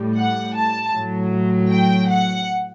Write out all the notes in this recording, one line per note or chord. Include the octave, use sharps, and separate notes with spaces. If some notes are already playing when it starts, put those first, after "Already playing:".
Already playing: A2 G3
F#5
A5
A2 F#3
G5
F#5